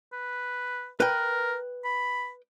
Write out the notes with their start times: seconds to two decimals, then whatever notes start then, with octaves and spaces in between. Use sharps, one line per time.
0.13 B4
1.00 A#4 B4 G5
1.85 B5